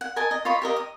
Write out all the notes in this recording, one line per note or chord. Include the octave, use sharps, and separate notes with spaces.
F#5
A#4 D#5 G#5 A5
D#5
F4 C#5 D#5 B5
G4 A#4 D#5
D#6